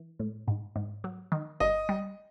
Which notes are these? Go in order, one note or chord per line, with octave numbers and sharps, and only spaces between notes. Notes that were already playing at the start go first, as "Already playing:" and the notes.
Already playing: E3
A2
G#2
G#2
F#3
D#3
G1 D#5
G3